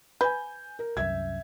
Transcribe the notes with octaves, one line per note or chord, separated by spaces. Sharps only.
B4 G#5 G6
A#4
C2 F#2 E5 G#6